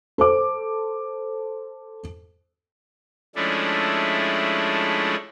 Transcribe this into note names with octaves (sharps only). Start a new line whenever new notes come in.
A4 C5 D6
F3 G#3 A3 C#4 D4 E4